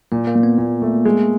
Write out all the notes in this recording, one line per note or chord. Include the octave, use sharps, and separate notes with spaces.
A#2 A#3
A#3
A#2
B3
A#2
A3
G#3